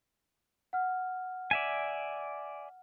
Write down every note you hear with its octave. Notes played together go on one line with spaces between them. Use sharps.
F#5 F6
D5 E5 G#5